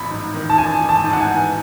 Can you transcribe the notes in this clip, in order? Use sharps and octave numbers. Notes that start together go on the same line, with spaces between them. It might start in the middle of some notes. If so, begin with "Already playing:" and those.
Already playing: A1 F#3 B5
G#2
D#3
A5
A1 G#5
A1
A5
G#2
F#5
G#5
E3